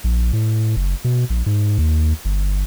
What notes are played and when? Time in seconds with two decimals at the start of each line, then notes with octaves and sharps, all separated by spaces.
0.04 A#1
0.33 A2
0.76 F#1
1.04 B2
1.30 A#1
1.46 G#2
1.78 D#2
2.25 G1